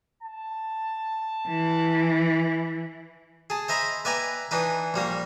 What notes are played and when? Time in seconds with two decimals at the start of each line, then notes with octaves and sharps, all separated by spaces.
0.23 A5
1.49 E3
3.50 G#4 A5
3.68 C5 D#5 E5 A#5 B5
4.05 B4 D5 E5 G5 G#5 A#5
4.51 E3 D4 D#4 B4
4.94 A#1 G3 A#3